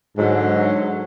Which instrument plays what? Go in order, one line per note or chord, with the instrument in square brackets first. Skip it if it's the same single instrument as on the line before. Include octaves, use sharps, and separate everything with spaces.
[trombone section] G#2 [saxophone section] D3 F#3